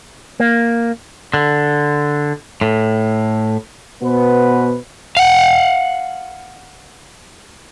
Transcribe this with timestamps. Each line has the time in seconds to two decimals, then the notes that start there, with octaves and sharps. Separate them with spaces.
0.40 A#3
1.34 D3
2.61 A2
4.02 B2 B3 B4 C5
5.17 F5 F#5